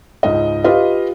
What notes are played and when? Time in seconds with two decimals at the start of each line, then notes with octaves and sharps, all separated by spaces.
0.23 C#2 G#2 D#5
0.64 F4 G4 B4 D#5